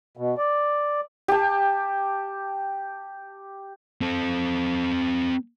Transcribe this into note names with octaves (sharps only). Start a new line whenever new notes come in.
B2
D5
G4 A5
C4 A4